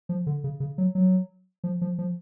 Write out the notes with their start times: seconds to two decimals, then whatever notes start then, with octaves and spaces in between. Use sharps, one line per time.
0.09 F3
0.27 D3
0.44 C#3
0.60 C#3
0.78 F#3
0.95 F#3
1.64 F3
1.81 F3
1.98 F3